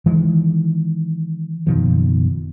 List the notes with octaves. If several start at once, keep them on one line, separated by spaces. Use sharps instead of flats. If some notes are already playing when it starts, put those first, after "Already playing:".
D#3 E3 G#3
F#1 B2 D#3 F3